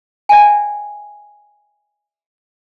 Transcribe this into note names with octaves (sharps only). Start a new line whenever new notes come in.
D5 E5 G5 G#5